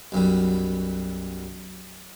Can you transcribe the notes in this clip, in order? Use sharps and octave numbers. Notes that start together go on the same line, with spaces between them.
B1 F#2 G3